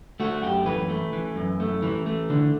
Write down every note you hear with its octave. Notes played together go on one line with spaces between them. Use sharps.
A3 F#4
F#2 G4
E3 B4
A3
E3
F#2
A3
E3
A3
D3